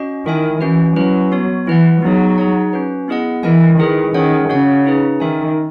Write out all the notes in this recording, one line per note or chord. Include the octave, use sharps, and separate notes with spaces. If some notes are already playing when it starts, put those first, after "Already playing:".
Already playing: C#4 F#4 D#5
D#3 E4 A#4 E5 G#5
E3 C#4 F#4 B4
F#3 C#4 E4 B4
B3 F#4 C#5
E3 E4 B4 F#5
F#3 B3 D#4 G#4
D#4 G#4 C#5 F#5
C#4 F#4 B4
B3 E4 G#4 D#5 F#5
E3 E4 A#4 D#5 G#5
D#3 E4 G#4 B4
D#3 C#4 G#4 C#5 F#5
C#3 F#4 C#5 F#5
D#4 G#4 B4
D#3 D#4 A#4 E5 G#5